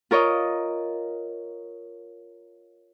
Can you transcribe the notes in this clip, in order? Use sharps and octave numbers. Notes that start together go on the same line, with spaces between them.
F4 A#4 C#5 D#5